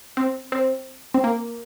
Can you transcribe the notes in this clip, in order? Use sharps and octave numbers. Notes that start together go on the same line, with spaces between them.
C4
C4
C4
A#3